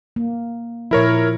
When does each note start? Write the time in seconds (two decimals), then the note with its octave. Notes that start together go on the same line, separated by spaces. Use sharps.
0.16 A#3
0.91 A#2 F3 E4 A#4 C#5